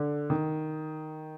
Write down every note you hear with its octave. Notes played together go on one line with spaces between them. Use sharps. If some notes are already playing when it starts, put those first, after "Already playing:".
Already playing: D3
D#3